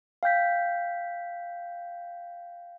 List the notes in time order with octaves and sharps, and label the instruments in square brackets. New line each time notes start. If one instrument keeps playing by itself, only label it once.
[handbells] F5 G5 G6 B6